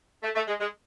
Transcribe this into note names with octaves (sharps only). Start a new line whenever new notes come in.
A3
A3
G#3
G#3